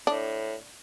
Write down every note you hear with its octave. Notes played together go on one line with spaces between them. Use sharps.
A2 D4